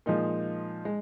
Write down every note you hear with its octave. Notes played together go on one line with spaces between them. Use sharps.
A#2 F3 G#3 D#4
G#3